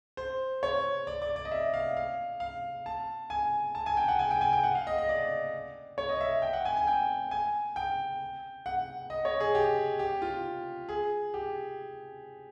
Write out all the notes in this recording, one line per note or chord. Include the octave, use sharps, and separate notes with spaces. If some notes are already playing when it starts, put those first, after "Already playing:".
C5
C#5
D5
D5
D5
D#5
E5
F5
F5
F5
A5
G#5
A5
G#5
G5
F#5
G#5
G5
G#5
G5
F#5
F5
D#5
D#5
D5
C#5
D#5
E5
G5
F#5
G#5
G#5
G5
G#5
G5
F#5
D#5
C#5
G#4
G4
G4
F4
G#4
G4